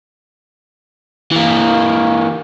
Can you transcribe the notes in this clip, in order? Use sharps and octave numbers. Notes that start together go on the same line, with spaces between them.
E3 A#3